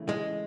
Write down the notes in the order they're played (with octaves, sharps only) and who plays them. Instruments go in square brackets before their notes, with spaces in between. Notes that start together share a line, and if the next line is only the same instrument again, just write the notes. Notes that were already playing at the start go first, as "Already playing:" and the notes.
Already playing: [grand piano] C#3 E3 A3 E4
[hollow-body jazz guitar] G#3